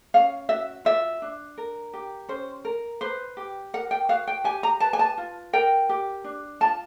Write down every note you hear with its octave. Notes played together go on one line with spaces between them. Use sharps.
C#4 F5
F#4 E5
F4 E5
D4
A#4
G4
C#4 C5
A#4
B4 C5
G4
A#4 F#5
G5
F#4 F5
G5
G4 G#5
A#5
B4 A5
G#5
A5
F4
A#4 G5
G4
D4
F4 A5